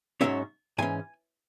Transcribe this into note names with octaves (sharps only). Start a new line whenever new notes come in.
G#2 F#3 C#4 C#5 E5
G#2 E3 C#4 G#5